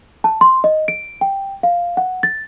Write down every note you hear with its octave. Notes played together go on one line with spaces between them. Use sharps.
A5
C6
D#5
D7
G5
F5
F#5
A6